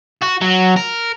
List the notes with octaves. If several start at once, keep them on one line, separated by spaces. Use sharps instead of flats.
F#4
F#3
A#4